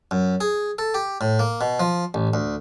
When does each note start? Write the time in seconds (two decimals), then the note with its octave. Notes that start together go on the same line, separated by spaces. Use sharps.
0.11 F#2
0.41 G#4
0.79 A4
0.94 G4
1.21 A2
1.39 A#3
1.61 B2
1.80 F3
2.14 A1
2.34 D2